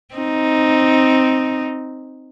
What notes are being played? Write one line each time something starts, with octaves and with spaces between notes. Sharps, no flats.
C4 D#4